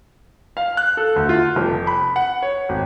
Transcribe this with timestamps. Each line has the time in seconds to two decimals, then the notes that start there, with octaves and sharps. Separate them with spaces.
0.57 F5
0.77 F#6
0.97 A4
1.16 D2
1.29 F4
1.56 F1
1.87 B5
2.16 F#5
2.42 C#5
2.69 G#1